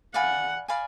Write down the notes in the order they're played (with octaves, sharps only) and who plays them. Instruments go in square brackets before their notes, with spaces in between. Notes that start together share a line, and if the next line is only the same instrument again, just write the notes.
[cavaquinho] D5 F5 G#5 B5 [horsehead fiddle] F#5
[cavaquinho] D5 F5 G#5 B5